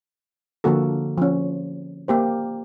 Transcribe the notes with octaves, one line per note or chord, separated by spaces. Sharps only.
D3 F3 A#3 F#4 A4
F3 C#4
A#3 G4 C5